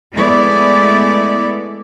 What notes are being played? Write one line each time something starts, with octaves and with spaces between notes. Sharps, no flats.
G#3 A3 B3 E4 D5